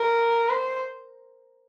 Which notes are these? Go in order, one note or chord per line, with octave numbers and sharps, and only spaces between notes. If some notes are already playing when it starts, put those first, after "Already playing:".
Already playing: A#4
C5